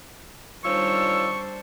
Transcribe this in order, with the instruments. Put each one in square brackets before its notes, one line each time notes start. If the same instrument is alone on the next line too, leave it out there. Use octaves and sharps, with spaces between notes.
[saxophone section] D#3 C#4 F4 [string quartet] G3 D4 C5 [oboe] C#6 [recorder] E6